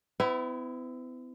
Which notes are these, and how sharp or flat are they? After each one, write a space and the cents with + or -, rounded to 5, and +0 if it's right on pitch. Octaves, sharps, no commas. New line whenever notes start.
B3 +45 E4 +0